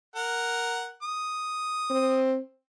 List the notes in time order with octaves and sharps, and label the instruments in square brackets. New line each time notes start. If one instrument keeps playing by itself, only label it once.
[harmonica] A#4 F#5
D#6
[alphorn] C4